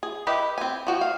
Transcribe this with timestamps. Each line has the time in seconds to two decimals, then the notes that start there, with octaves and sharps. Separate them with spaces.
0.03 G#4
0.27 E4 G4 B4 D#5 E5
0.58 C4 G#5
0.87 F3 F#4 G5
1.01 F5